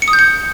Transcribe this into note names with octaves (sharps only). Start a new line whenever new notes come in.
C#7
D#6
G6
C#7